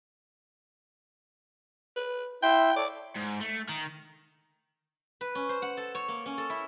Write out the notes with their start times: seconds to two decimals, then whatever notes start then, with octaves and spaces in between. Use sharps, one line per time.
1.96 B4
2.43 E4 E5 G5 C6
2.76 A4 C#5 D5
3.16 G#2
3.41 A3
3.69 D#3
5.21 B4
5.35 C#4
5.49 C5
5.62 F#5
5.77 A4
5.95 C#5
6.08 A#3
6.26 C#4
6.38 A4
6.50 E4